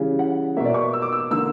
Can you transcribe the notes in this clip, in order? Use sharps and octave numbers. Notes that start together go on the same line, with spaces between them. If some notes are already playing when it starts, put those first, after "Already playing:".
Already playing: C#3 E3 G3
F#5
B2 A#3 E5
D5
C#6
E6
D6
E6
D3 A#3 E6